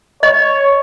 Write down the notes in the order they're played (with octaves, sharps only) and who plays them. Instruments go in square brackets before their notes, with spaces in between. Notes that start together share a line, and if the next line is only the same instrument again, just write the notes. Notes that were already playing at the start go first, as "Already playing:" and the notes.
[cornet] C#5 [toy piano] D#5